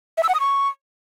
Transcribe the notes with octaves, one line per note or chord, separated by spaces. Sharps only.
E5
E6
F#5
D#6
C#6